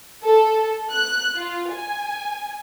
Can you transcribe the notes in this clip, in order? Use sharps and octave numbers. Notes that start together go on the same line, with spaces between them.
A4
F#6
F4
G#5